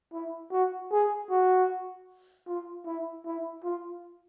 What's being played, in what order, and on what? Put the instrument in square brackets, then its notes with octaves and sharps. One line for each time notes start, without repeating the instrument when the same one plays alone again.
[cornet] E4
F#4
G#4
F#4
F4
E4
E4
F4